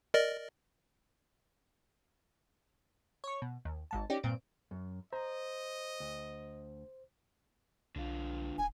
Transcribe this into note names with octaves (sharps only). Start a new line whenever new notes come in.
A#4 D5 D#5
C#5 C#6
B2
D#2
G#1 G#2 A5
C#4 D#4 G4 D5
G2 A#2 C4 D7
F#2
C5 D#5 A#5
D2
B1 D3 F4
D1 G#5